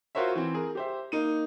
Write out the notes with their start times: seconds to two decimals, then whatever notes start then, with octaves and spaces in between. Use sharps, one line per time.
0.15 F4 F#4 A#4 C5 C#5 E5
0.35 E3 C4
0.54 G#4 A#4
0.75 G4 C5 E5
1.12 A#3 D#4 D#7